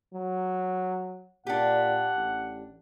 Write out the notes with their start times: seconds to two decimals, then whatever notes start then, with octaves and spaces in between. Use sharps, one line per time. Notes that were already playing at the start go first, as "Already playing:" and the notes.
0.14 F#3
1.47 A#2 D4 G4 F#5
2.17 A1